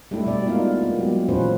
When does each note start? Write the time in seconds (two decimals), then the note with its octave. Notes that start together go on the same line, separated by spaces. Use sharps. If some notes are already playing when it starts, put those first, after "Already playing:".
0.11 G3 A3 D4 E4 G4
0.26 B2 A3 G4 D5
0.46 G#3 A#3 D#4 F4 F5
0.83 A#3 B3
0.98 F#3 G#3 A#3 G4
1.29 A#2 E3 C#4 F4 B4 C5